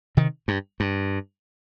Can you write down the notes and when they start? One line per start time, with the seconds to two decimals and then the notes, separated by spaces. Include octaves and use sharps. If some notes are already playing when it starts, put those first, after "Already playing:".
0.17 C3 D#3
0.48 G2
0.80 G2